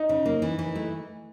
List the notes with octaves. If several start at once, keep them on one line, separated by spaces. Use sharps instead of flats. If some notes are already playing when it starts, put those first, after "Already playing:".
Already playing: D#4
C#3
A#3
E3
E3
A3